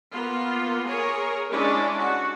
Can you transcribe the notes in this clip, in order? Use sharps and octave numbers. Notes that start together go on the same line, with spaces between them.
A#3 B3 F4
G#4 A#4 C#5
G#3 C#4 D4 E4
F#4